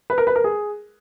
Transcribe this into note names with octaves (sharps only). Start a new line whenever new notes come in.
B4
A#4
B4
A#4
G#4